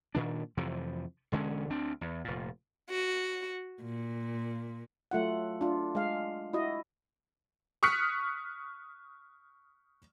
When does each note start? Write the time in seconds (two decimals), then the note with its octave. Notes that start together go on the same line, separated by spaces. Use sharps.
0.15 A#2 D#3 D4
0.57 F2 C3 E3 F3
1.32 E1 D3 G#3 C#4
1.70 D2 C4 D4
2.01 E2
2.24 F1 A#2
2.90 F#4
3.84 A#2
5.11 F#3 A3 F4 F#5
5.61 D4 F4
5.95 G#3 F5
6.53 E4 F#4 D#5
7.83 C#6 D#6 F6 F#6 B6 C#7